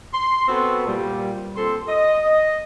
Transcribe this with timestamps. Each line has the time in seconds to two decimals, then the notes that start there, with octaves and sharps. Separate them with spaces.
0.14 C6
0.48 B3 C4 F#4 A4 B4
0.86 A#2 G3
1.56 A#2 C4 A4 C6
1.89 D#5